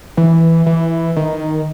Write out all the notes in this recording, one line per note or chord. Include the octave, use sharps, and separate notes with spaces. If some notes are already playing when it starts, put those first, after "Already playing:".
E3
E3
D#3